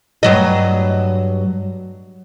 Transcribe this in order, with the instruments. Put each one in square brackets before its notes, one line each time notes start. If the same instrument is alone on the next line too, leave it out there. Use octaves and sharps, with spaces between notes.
[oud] G2 F#3 D#5